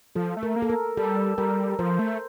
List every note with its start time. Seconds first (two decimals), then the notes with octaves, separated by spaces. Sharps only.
0.16 F3 A4
0.37 A3
0.43 A#4
0.56 A#3
0.62 A4
0.70 A#4
0.97 G3 A4
1.38 G3 A#4
1.79 F3 C5
1.99 A3